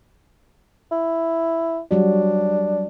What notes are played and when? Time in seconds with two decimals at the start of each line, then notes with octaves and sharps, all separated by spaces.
0.91 E4
1.91 F#3 G3 D4 F#4